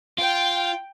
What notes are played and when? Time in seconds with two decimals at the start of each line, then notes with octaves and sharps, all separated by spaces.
0.18 F4 G5